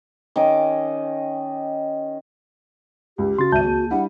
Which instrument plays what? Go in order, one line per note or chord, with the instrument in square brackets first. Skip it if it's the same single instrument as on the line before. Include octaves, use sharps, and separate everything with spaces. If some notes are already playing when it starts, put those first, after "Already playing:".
[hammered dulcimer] D#3 C#4 D#5 D6
[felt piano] C#2 [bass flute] G4
[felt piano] C#3 [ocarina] F#4 [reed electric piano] C6 A6
[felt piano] G#1 D#7 [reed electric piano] C#2 A5 G6 [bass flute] E5
[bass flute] A#3 [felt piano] G#4
[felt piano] G3 D4 E4 [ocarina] F#5